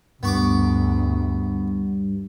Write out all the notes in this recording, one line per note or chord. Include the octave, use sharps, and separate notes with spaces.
D2 G2 B3 C#6 D6